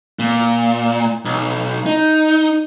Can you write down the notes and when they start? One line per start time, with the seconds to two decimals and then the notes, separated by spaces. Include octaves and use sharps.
0.19 A#2
1.25 B1
1.86 D#4